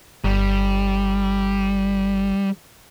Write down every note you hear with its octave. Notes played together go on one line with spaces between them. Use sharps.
G1 G3